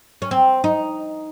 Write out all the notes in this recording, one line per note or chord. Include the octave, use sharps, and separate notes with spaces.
C#4
C4
D#4